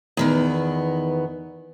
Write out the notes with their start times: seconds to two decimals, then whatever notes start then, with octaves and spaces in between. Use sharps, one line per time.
0.17 E2 D#3 B3